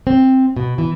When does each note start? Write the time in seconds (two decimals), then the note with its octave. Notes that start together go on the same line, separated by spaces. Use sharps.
0.07 C4
0.57 B2
0.78 E3